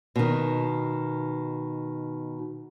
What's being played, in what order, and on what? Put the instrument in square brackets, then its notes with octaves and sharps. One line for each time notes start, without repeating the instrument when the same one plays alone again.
[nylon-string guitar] B2 D#3